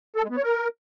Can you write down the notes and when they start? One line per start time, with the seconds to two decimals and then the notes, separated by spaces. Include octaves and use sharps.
0.16 A4
0.23 G#3
0.30 B3
0.37 C#5
0.43 A#4